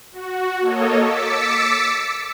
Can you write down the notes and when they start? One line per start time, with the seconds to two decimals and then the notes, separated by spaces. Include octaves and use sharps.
0.12 F#4
0.61 A#3 A4 C#5 D#5
1.01 D6 E6 A6 B6 C#7